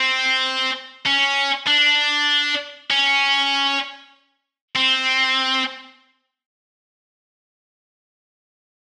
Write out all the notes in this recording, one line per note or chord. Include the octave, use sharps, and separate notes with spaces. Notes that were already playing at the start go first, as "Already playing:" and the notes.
Already playing: C4
C#4
D4
C#4
C4